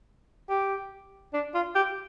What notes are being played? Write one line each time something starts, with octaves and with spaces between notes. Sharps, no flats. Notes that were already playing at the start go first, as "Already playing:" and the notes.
G4
D4
F4
G4